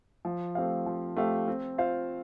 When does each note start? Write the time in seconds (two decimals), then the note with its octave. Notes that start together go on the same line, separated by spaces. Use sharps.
0.25 F3
0.55 A3 C4 G4 F5
0.86 F3
1.16 A3 C4 G4 F5
1.48 C4
1.78 F4 C5 F5